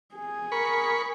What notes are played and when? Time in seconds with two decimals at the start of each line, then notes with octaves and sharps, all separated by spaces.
0.15 G#4
0.52 A#4 B5 C#6